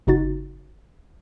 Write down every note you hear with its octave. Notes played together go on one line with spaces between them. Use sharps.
G1 C#3 D#4 F#4 A6